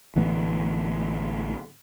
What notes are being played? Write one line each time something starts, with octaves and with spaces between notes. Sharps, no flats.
A1 D3 E3 B3